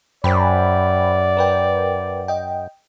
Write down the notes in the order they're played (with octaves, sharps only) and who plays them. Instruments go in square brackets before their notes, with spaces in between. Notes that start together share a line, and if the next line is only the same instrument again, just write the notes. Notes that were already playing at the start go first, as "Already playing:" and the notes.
[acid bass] F#2 [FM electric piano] C5 G5 B5 [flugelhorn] D5
[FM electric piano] A#4 B4 G5
D#5 G5